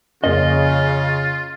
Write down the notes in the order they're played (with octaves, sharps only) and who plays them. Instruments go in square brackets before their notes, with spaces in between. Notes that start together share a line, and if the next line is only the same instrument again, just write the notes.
[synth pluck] F2 A#3 C#4 [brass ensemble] C#3 [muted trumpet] F4 [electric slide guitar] D#5